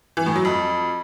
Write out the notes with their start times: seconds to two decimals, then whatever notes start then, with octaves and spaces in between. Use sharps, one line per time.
0.17 E3
0.26 A2
0.36 F#3
0.45 F2